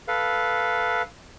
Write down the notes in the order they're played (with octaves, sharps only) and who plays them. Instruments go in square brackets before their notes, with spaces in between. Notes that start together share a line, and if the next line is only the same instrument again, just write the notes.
[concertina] A4 B4 F5